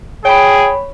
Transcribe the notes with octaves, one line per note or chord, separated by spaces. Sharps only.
G#4 C#5 G5 B5